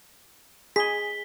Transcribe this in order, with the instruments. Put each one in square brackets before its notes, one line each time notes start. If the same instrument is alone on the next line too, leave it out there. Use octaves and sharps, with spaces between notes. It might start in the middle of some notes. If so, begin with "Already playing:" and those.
[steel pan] G#4 [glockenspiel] B6 G7